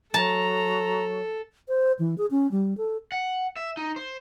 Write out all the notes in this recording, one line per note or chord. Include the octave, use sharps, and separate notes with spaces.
F#3 A4 A5 A#5
C5
E3
G#4
C#4
G3
A4
F#5
E5
D#4
C5